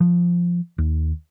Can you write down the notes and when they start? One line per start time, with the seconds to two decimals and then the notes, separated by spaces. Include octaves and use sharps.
0.01 F3
0.78 D#2